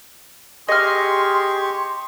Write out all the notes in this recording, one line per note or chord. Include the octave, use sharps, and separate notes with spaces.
G4 G#4 D#5 C6 C#6 F6